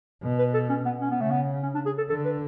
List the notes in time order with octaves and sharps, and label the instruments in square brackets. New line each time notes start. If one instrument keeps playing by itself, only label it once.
[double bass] B2
[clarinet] B4
A4
C#4
B3
C#4
B3
[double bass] C#3 [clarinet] A3
[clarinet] B3
C#4
D4
G#4
A4
[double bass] D3 [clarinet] A4
[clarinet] B4